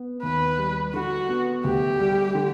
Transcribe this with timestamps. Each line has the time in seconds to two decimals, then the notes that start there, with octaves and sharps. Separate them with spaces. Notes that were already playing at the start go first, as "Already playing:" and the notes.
Already playing: B3
0.23 D#2 B4
0.59 G3
0.94 D3 F#4
1.29 B3
1.64 D2 G4
2.00 G3
2.35 D3